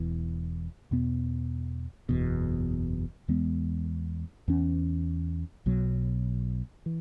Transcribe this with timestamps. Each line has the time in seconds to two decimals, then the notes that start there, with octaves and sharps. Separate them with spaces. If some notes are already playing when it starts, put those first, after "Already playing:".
Already playing: E1 E2 E3
0.91 E2 B2 B3
2.09 F#1 E2 B2
3.28 E2 E3 G#3 B3
4.48 E2 E3 C#4
5.66 B1 B2 F#3
6.86 E3